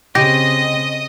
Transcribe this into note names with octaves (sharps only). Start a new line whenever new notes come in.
C#3 C4 G4 D#5 A#6